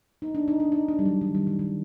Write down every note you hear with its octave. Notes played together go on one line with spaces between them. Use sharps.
D#4
D4
D#4
D4
D#4
D4
G3
F#3
D#3
G3
D#3
D#3